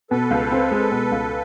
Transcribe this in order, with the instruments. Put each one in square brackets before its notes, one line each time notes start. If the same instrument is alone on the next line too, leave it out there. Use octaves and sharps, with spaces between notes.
[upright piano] B2 [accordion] A4 B4
[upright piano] C#2
C4
G#3
B2
C#2